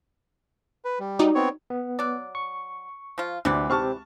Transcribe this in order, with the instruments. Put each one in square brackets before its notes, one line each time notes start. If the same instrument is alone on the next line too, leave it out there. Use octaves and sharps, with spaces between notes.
[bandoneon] B4
G3
[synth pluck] D#4 F#4 D5
[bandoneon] B3 C4 C#5
[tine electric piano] B3
[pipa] F#3 D5
[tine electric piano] C#6
[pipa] F3 F4
[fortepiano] D2 [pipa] C3 E3 D5
[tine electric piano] C4 G4 [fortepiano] A5 C#6 F6